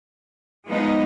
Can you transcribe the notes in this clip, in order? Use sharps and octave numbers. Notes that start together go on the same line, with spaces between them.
F3 G#3 B3 D#4